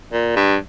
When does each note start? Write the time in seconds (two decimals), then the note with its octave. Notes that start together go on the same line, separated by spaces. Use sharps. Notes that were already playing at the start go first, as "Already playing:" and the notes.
0.13 A#2
0.36 G2